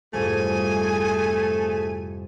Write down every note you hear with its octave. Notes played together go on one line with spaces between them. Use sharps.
C2 F2 G#2 A3 G#4 G#5